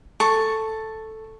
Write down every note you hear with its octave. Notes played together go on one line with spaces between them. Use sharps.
A4 C#6